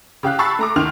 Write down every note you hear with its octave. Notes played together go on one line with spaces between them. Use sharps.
C#3 G4 F5 F#6
A5 B5 C#6 E6 A6 C7
A3 A#5 D6
D2 D#3 C6 F6 F7